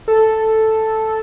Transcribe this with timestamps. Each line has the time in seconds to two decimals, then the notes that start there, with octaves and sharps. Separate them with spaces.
0.08 A4